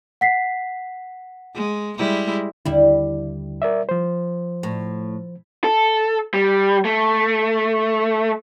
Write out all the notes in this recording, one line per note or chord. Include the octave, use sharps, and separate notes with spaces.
F#5 B6 C7
G#3
G3 G#3 E4
D#2 D3 G3 E4
A#4 D5 E5
F3 C5
A2
A4
G3
A3